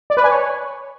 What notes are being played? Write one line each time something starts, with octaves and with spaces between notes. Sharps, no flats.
D5
B4
G#5
C#5